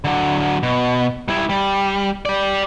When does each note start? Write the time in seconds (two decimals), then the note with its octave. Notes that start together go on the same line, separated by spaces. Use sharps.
0.04 D3 F#3
0.63 B2
1.28 G3 E4
1.49 G3
2.25 G4 D5